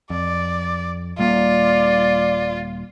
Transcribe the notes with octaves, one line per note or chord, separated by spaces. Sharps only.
F2 D5
D#1 G3 A#3 F4 D5